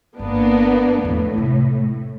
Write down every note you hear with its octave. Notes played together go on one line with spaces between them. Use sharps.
G1 A#3 B3 D4
E2 A2 F3
C3